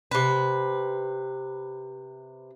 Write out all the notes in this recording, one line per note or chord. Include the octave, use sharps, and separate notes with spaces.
C3 B4